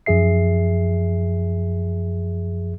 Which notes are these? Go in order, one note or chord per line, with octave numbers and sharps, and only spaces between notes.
F#2 F3 G#4 E5 C7